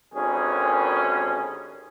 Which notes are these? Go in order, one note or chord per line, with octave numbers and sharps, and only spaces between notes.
G#1 D#2 D3 C#4 G#4